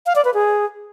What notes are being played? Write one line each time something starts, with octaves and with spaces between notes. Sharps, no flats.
F5
D5
B4
G#4